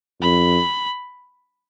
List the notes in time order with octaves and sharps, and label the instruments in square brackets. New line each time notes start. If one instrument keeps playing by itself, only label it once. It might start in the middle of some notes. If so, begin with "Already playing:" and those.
[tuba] F2 [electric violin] B5